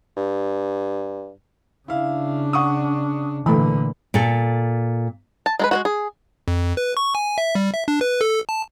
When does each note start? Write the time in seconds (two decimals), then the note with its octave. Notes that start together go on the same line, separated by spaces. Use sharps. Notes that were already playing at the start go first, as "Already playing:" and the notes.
0.17 G2
1.88 C#3 D4 E4 F5
2.53 F#5 C#6 D#6
3.46 A#2 D3 E3 A3 B5
4.14 A#2 A4
5.46 A5
5.59 G#3 A4 B4
5.71 G#3 A#3 F#4
5.85 G#4
6.48 F2
6.77 B4
6.97 C#6
7.15 G#5
7.38 E5
7.55 G3
7.74 E5
7.88 D4
8.01 B4
8.21 A4
8.49 A5